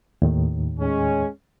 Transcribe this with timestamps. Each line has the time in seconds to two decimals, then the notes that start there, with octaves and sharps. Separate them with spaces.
0.22 D#2 A2 D#3
0.80 G#3 C#4